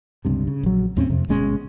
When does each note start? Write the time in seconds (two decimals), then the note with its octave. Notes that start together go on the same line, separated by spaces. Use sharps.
0.25 C#2 G2 C3
0.47 C#3
0.63 A#1 F#3
0.97 D#2 A2 C4 C#4
1.10 F2 C3
1.29 G1 B2 G#3 C#4